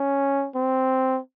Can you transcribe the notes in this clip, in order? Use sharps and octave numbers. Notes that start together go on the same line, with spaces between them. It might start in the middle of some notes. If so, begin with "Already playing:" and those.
Already playing: C#4
C4